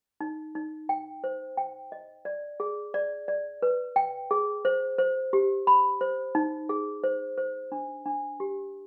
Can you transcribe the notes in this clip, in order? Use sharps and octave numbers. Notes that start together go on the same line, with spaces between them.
D#4
D#4
G5
C5
G5
D#5
D5
G#4
D5
D5
B4
G5
G#4
C5
C5
G4
B5
C5
D#4
G#4
C5
C5
D4
D4
G4